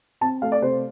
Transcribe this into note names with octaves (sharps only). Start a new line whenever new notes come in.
C4 A5
A3 F5
D5
C3 C5